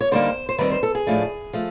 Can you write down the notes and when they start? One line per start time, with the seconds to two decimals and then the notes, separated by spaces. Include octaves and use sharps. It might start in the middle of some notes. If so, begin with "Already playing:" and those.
0.01 C#5
0.12 D3 G3 A#3 D#4 C5
0.49 C5
0.58 D#3 G3 C4 D#4 B4
0.71 C5
0.83 A4
0.95 G#4
1.07 A2 F3 A3 D4
1.53 F3 A3